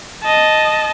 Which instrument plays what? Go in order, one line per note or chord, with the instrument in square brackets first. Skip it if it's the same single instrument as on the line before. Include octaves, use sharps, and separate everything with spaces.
[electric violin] D#5 A5